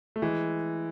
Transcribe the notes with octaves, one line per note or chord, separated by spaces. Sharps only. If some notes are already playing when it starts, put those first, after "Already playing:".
A3
E3 G#3